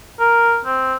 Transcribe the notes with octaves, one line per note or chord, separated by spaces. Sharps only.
A#4
C4